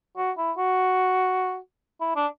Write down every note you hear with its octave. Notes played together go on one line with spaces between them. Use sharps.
F#4
E4
F#4
E4
D4